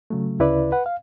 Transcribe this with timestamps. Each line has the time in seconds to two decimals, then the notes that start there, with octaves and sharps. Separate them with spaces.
0.10 C#3 F#3 A3
0.39 D2 C#3 E4 B4 D5
0.72 B4 F#5
0.86 F5